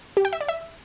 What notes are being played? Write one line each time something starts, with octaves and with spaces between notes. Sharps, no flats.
G4
G5
E5
D5
E5